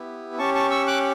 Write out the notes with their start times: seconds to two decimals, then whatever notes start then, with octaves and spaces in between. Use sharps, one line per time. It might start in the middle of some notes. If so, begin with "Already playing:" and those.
Already playing: B3 E4 G4
0.38 C#4 G4 A5 C#6
0.55 A5 C#6
0.71 C#6 E6
0.87 D6 F#6